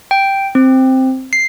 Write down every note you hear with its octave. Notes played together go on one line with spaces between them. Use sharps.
G5
C4
C7